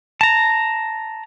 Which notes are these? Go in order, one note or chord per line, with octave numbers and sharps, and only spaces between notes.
A5 A#5